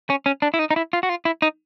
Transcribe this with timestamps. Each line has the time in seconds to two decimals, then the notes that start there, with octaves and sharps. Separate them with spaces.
0.10 C#4
0.26 C#4
0.42 D4
0.54 E4
0.59 D#4
0.71 D#4
0.76 E4
0.93 F4
1.03 F#4
1.09 F4
1.25 E4
1.42 D#4